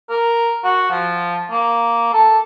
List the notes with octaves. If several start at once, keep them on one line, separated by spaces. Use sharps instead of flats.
A#4
F#4
F3
A#3
A4